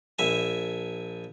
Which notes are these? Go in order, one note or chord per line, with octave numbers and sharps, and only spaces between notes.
A#1 E5 G#5